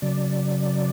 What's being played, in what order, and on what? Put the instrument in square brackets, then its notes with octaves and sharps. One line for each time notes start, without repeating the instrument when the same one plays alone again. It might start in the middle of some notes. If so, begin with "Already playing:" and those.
[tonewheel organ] C#3 F#3 D5